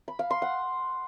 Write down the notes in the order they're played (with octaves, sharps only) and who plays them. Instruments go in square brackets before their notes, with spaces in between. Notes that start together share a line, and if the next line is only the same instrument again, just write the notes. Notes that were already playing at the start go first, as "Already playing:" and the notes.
[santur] B5
F5
C6
F#5